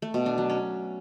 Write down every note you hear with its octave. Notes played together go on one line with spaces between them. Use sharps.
A3
B2
D4
F#3
C#4